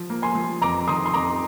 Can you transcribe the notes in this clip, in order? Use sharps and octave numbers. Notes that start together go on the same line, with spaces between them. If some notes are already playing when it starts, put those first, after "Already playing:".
Already playing: F3
A#3
G#5 C6
F3
F2 A#5 D6
D#3 C6 D#6
C6
F2 A#5 D6